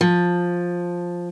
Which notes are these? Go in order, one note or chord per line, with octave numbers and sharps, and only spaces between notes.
F3